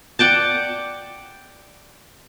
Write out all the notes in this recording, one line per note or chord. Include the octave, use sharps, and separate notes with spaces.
D5 F#5 G5 A5